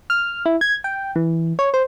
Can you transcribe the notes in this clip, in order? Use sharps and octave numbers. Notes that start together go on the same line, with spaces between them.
F6
E4
G#6
G5
E3
C#5
C5